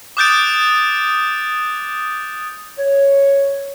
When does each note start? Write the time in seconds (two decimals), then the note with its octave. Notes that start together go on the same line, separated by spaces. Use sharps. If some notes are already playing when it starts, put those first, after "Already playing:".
0.17 D6 D#6 F#6 G6 A6 D7
2.77 C#5